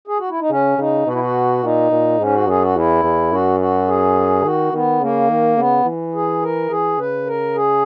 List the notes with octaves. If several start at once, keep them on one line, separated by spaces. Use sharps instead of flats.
G#4
F#4
E4
D#4
C#3 C#4
C#3 D#4
B2 F#4
E4
F#4
A#2 D#4
A#2
G#2 C#4
F#4
F#2 G#4
F#4
E2 E4
E2
F#2 F#4
F#4
G#4
D#3 F#4
D#3 B3
C#3 A#3
D#3
C#3 B3
E3
G#4
A#4
E3 G#4
C#3 B4
A#4
G#4